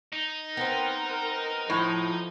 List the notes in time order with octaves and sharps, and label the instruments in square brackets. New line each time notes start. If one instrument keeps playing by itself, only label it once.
[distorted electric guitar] D#4
[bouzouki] B3 C4 [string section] A#4 C5
[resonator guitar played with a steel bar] A2 [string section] F3